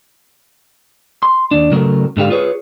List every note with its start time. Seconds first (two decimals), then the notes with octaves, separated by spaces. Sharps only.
1.23 C6
1.51 D#2 D4
1.72 C#3 F#3 A3 A#4
2.17 G#2 D3 G4 F5
2.30 F4 G#4 B4 C#5